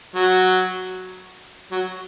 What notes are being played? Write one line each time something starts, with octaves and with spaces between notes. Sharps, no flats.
F#3
F#3